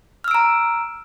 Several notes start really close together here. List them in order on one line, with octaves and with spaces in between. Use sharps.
F6 E6 D7 A#5